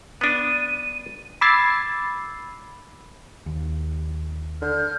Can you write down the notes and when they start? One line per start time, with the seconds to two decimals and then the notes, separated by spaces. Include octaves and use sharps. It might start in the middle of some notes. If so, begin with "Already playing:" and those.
0.21 B3 D4 D#7
1.41 B5 D6 E6 G#6 A6 C7
3.46 D#2
4.61 D3 F6 G6